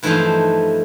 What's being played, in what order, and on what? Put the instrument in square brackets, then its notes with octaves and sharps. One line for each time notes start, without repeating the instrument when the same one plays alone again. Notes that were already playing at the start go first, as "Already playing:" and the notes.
[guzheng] G2 E3 F3 A3 D#4 C5